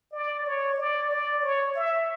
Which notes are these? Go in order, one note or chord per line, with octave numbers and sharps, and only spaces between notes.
D5
C#5
D5
D5
C#5
E5